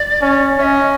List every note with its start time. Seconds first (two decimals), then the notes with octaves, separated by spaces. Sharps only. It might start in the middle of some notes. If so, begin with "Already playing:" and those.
Already playing: D5
0.22 C#4
0.59 C#4 E5
0.64 D#5